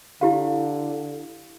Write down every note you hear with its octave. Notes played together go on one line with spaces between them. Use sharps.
D3 E4 G4 F5